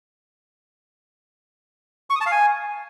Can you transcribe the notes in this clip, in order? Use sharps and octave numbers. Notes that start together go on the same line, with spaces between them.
C#6
D#6
A5
F5
G#5